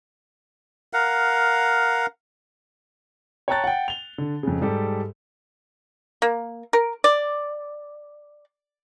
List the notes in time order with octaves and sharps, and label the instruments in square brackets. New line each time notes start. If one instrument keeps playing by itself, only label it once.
[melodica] A#4 F5 F#5
[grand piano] C#5 G5 A5 A#5 F#6 A6
F#5 G5
F7 G7
D3
F2 C#3
G#2 G3 G4 A4
[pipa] A#3
A#4
D5